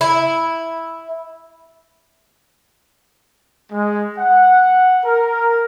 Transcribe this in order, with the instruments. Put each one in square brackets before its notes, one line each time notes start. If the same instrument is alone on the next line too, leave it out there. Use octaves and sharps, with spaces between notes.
[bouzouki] E4
[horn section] G#3
F#5
A#4